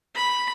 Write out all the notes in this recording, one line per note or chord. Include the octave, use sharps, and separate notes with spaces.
B5